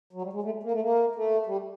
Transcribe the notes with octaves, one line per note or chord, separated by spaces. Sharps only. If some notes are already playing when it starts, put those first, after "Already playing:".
F#3
G3
G#3
A3
A#3
A3
A#3
A3
G3